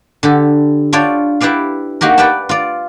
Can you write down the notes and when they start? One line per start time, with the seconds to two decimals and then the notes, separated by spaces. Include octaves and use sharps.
0.23 D3 G4 A4
0.93 D4 F4 C#5 D5 G5
1.41 E4 G4 B4 D5 F5
2.01 A#3 D#4 F#4 G4 A#4
2.18 B4 D5 F#5 G5 A5
2.49 F4 D5